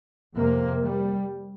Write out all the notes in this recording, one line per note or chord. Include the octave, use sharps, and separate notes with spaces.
F2 C3 A#3
G3